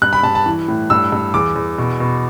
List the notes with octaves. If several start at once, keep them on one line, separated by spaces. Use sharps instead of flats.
G2 F#6
B5
G2 A5
A5
E3
A2
G2 E6
G2
E2 D6
E2
B2
B2